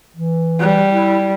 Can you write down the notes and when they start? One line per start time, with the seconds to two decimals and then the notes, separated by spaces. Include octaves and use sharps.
0.17 E3
0.59 G3
0.92 E4